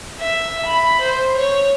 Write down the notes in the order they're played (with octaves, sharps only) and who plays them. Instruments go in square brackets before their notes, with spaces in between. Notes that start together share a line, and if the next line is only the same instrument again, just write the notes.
[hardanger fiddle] E5
B5
C5
C#5